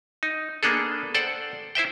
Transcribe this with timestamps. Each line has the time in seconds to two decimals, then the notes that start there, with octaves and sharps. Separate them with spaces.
0.23 D#4
0.63 A#3 B3 D4 G#4 A4
1.14 A4 C5 D5 F#5 G5
1.75 E4 C5 E5 G5